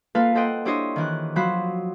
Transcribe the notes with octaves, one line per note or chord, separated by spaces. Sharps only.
A#3 F4 A4 B4 F5
A4 C5 D#5 F#5 G5
D4 E4 G4 C5 C#5 D#5
D#3 E3 F#6
F3 F#3 C5 B5 F#6